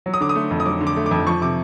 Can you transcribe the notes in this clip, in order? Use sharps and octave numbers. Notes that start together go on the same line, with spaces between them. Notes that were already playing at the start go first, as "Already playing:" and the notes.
F#3
D#6
D3 D6
D#6
A3
F2
D#6
F#3 D6
D3
D6
A3
D6
F2
F3 C#6
C3 D6